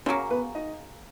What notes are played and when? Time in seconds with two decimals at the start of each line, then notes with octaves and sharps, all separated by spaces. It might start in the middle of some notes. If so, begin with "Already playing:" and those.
0.06 C#3 F#3 A#3 C#4 C#5
0.30 B3 B4
0.55 D#4 D#5